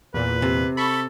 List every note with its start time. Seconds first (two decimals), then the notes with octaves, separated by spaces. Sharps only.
0.14 E2 A#2 B4
0.42 C3
0.77 A4 B5 C#6 C#7